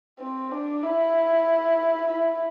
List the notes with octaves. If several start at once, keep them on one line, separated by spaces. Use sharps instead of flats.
C4
D4
E4
E4